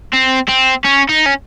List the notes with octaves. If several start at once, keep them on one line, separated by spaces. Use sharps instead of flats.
C4
C4
C#4
D#4
C#4